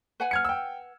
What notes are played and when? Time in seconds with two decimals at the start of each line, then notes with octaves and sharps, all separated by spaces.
0.20 B4 F#5 G#5
0.31 F6 G#6 C#7
0.45 G5 E6